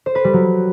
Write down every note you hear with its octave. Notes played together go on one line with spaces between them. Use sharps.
C5
B4
G3
F#3